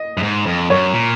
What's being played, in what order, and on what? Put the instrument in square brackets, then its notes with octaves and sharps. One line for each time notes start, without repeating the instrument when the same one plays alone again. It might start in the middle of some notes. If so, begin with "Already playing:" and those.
Already playing: [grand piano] D#5
[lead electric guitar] F#2
G#2
F2
[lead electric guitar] F#2 [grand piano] C#5
[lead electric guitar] A#2